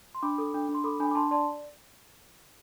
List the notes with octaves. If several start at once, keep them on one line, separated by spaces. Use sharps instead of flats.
C6
D4 B5 D6
A4
D4
D4
C6
A4 B5 D6
D4 G#5 B5
D6
D4 A5 C6
D5 A5 C6